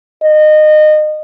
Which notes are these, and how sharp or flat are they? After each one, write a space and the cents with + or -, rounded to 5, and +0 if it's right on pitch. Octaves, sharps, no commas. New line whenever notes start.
D#5 -25